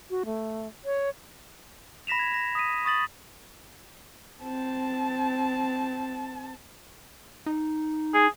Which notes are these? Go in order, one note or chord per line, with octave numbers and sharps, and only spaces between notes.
F#4
A3
C#5
B5 A#6 B6 E7 F7
G#6
A#6
D#6 B6 D#7
C#6 D#6 A6 F#7
C4 A5
D#4
G#4